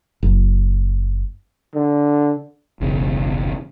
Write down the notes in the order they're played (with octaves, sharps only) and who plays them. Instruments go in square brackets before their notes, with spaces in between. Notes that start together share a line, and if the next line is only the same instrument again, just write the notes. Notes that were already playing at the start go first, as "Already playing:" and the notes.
[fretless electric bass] F#1
[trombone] D3
[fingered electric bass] F#1 B1 E2 C#3